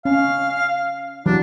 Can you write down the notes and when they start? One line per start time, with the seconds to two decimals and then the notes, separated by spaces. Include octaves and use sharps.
0.05 C#4 F5
1.26 E3 F#3 D4